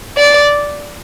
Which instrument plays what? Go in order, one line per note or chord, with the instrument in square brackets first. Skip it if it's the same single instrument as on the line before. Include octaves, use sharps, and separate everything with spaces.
[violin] D5